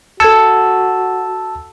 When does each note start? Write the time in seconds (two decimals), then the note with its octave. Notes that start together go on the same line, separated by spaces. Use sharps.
0.20 F#4 A4 A5 E6 G#6 C#7